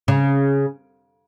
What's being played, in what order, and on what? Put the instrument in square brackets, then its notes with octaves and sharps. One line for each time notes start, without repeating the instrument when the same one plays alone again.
[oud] C#3